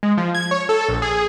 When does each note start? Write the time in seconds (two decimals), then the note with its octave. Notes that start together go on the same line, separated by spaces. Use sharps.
0.03 G#3
0.18 F3
0.35 G#6
0.51 C#5
0.69 A4
0.88 A#1
1.02 G#4